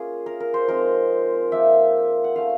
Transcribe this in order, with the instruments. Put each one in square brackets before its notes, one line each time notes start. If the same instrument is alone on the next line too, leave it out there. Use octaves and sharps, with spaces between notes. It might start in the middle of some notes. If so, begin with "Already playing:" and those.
Already playing: [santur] A#3 C#4 F4 G#4
A#4
A#4
C5
F3 G#3 C4 D#4 A#4
F3 A#3 D#4 E5
F#5
A3 C#4 F4 F5